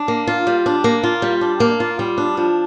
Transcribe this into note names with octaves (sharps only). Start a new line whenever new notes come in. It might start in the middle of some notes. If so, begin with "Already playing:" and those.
Already playing: D4
A#3
F4
G3
D4
A#3
F4
G3
D4
A#3
F4
G3
D4
F3